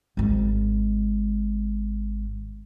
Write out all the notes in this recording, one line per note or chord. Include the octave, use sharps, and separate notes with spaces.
G#1 G#3